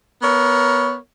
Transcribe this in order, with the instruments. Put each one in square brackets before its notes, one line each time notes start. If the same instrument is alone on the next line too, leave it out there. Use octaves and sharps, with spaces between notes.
[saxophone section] B3 A#4 C#5